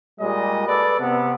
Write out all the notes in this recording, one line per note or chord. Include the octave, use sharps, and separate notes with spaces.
A#2 G3 G#3 D#5
A4 B4 D5
C3 B3